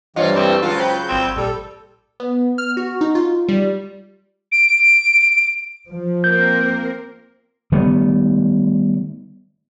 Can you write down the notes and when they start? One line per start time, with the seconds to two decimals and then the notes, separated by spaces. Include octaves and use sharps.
0.16 G2 E3 F#3 G3 F4 C5 C#5 D#5
0.36 A3 C4
0.62 C#2 F#3 F4 A5
0.77 C5 G5 B5 G6
1.08 G#1 C4 G#6
1.36 A#1 G3 A4
2.20 B3
2.58 F6
2.77 F#4
3.01 D#4
3.15 F4
3.49 G3
4.52 D7
5.90 F3
6.24 A#3 C4 A#4 G6
7.72 D#3 G3 A3 B3